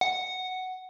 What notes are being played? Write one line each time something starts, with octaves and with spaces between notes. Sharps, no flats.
F#5